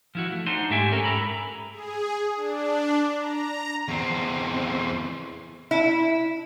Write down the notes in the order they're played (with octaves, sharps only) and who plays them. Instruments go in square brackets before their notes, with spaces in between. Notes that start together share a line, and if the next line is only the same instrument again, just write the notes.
[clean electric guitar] F3 E4 F#4
A3
D4 D#4 C5 F#5 G#5 C6
G#2 A3 G4 E5 G5 G#5
C#4 A4 A#4
G#2 A4 A#5 B5
[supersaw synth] G#4
D4
A#5
[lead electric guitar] E2 C4
[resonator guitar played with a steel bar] E4